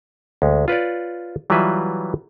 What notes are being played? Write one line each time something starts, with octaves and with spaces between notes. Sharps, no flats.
D2 G#3
F4 B4 C#5 D5
E3 F#3 G3 F4 B4 E5